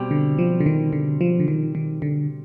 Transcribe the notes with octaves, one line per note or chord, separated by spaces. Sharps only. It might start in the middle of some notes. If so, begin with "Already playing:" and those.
Already playing: B2 G3 C4 G4
D3
F3
D3
D#3
D3
F3
D3
D#3
D#3
D3